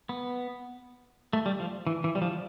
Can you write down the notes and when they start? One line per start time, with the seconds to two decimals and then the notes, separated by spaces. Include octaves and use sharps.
0.09 B3
1.33 A3
1.46 G3
1.60 F3
1.87 E3
2.04 E3
2.15 G3
2.22 F3